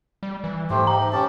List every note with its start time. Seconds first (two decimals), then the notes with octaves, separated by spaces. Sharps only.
0.23 G3
0.44 E3
0.70 G#2 A3 G4 C5
0.87 D#4 G4 A#5
1.12 C#4 G4 A5